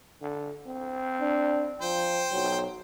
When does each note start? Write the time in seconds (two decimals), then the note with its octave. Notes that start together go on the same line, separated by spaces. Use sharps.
0.22 D3
0.66 C4
1.21 D4
1.81 F3 C5 G5
2.32 B1 F#3